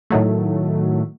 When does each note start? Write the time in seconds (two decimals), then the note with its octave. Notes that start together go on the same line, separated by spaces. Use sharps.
0.10 A2 D#3 F#3 A3